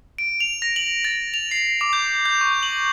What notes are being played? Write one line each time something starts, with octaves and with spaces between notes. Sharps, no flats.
D7
F7
A#6
F#7
A6
F7
C7
D6
G6
G6
C#6
F#7